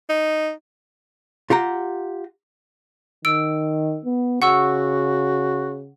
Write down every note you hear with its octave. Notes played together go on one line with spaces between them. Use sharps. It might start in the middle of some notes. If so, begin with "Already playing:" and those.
D#4
F4 G4 F#5 A#5
D#3 E6 D7
B3
C#3 F#4 F#5 C#6 E6